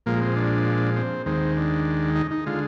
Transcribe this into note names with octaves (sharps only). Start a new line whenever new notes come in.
A#2 F3 G#3 A#3
C4
D4
C4
D#2 D#3 G#3 C4
D4
D#4
D#4
D3 G#3 F4